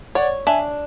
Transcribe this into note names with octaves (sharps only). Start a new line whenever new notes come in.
C#5 D5 F#5
D4 E5 G#5